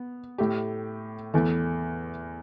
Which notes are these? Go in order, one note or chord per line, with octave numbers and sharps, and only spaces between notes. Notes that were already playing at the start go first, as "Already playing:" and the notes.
Already playing: B3
A2 A3 G4
E2 E3 A3